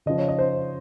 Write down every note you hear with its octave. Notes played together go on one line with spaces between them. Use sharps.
C#3 F3 D#5
C#5
D#5
C5